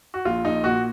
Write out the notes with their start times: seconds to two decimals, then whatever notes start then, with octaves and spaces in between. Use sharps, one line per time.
0.14 F#4
0.25 A#1 F4
0.45 A#1 D#4
0.64 A#2 F#4